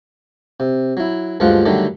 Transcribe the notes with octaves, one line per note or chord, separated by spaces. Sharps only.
C3
F#3 E4
D2 G2 F3 G#3 F4 F#5
D3 D#3 F#3 G3 A3